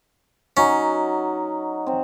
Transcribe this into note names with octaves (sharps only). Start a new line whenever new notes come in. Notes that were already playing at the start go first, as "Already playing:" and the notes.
F#3 C#4 D#4 F#4
C4